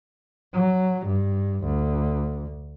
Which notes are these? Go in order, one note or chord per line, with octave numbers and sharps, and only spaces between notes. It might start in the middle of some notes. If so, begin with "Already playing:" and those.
F#3
G2
D2